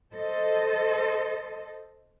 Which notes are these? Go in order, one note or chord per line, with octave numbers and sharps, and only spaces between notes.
A4 C5 D#5